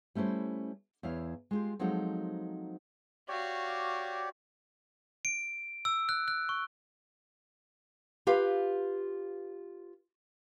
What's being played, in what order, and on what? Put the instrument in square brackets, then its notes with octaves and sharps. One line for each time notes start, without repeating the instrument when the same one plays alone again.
[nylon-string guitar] G3 A3 C#4 E4 C5
E2 E4 C#5 F5
G#3 F4 G4
F3 F#3 G#3 C4 D#4 A4
[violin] F#4 F5 [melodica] G4 C#5 D5
[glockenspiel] D7
E6
F#6
F#6
C#6
[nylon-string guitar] F4 G4 B4 F5